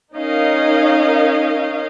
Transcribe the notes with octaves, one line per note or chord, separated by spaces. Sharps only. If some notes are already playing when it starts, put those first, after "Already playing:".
C#4 D#4 A#4 D#5 F5